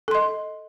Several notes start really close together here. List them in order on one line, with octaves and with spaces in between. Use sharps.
A4 C6 D#5